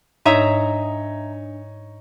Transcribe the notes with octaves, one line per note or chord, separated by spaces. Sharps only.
G#2 D4 D#4 C#5 E5 A#5 D#6